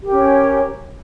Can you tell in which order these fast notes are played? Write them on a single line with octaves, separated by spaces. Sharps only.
G4 A#4 C#4 C#5